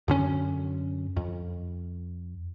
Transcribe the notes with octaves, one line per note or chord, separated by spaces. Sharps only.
F#2 D3 C#4
F2